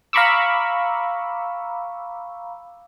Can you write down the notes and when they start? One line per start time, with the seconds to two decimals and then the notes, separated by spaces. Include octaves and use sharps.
0.13 F5 A#5 B5 C#6 D6 E6